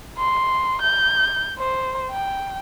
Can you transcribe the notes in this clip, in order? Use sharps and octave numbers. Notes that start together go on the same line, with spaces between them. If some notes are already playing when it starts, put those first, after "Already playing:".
C6
G6
C5
G5